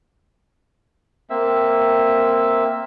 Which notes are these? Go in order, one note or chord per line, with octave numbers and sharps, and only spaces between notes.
A#3 C4 E5